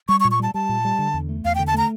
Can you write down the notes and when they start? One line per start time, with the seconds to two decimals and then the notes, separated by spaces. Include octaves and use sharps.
0.09 G3 C#6
0.20 C#6
0.25 A#2
0.31 C#6
0.40 G3 A5
0.54 G3 A5
0.69 A#2
0.85 G3
0.99 D3
1.14 E2
1.29 A3
1.45 E2 F5
1.55 G5
1.59 D3
1.67 A5
1.74 A3 A#5